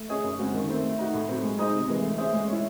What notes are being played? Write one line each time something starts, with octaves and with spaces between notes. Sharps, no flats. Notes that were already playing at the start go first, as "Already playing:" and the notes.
Already playing: A3
C#4 G#4 D#5
F#2
C#3 G#3 C4 F#4
D#3
A3 C4
A3
D#4 F#4
A2
F#3 C4
G#3
D#4 G#4 C5 D#5
C3
E3 G#3
A3
C#4 G#4 C5 E5
G#3
C#4 E4